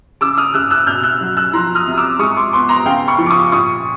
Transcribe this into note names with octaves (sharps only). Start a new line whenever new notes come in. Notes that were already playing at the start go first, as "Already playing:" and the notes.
C#3 D6 E6
D#6 F6
C#3 E6 F#6
E6 F#6
B2 F6 G6
E6 F#6
F#3
E6 F#6
F3 A#5 C6
D#6 F6
C3
D#6
D6 E6
G#3 C#6 D#6
C6 D6
B3 C6 D6
A#5 C6
C#3 F5 G5
B5 C#6
F3
D6
C#6 D#6
A#2 C#6 D#6